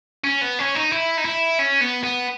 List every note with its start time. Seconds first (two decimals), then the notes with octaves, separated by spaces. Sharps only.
0.24 C#4
0.41 B3
0.59 C#4
0.75 D#4
0.92 E4
1.17 D#4
1.25 E4
1.59 C#4
1.81 B3
2.04 B3